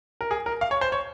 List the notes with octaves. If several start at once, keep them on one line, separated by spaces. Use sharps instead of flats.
A#4
G#4
A#4
F5
C#5
C5
C#5